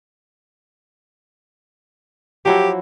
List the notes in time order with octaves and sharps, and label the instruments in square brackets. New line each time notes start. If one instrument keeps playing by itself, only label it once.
[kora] F3 F#3 E4 [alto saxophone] G4